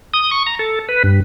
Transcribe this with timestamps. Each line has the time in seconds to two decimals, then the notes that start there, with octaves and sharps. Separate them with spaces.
0.14 D#6
0.31 C#6
0.46 A#5
0.59 A4
0.89 B4
1.04 G2